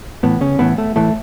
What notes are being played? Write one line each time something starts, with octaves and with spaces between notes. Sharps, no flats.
A2 E3 B3
C#3 C#4
A2 E3 B3
A3
A2 E3 A3